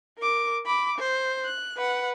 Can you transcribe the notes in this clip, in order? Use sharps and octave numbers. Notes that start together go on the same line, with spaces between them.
A#4 D6
B5 D6
C5
F#6
B4 F#5